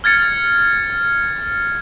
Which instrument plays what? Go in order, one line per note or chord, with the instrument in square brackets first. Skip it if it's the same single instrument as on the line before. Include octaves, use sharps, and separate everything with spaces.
[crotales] F6 G#6 A6 C#7